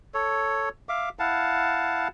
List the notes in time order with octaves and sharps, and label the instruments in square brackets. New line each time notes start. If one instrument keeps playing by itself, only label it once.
[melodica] A4 C#5
E5 F5 D6
E4 F5 F#5 A5